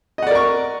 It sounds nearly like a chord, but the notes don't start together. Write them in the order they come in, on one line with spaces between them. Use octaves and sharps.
D#5 F#5 D5 A#4 C#6